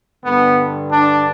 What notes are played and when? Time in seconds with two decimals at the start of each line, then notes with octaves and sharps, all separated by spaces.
0.24 G2 D3 B3
0.92 D4